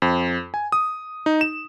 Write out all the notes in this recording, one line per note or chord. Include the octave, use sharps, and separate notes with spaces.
F2
G#5
D#6
D#4
E7